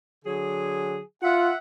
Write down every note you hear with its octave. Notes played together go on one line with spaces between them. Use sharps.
D3 F#3 G#4
F4 E5 F#5